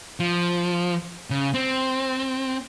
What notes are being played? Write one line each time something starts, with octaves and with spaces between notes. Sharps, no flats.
F3
C#3
C4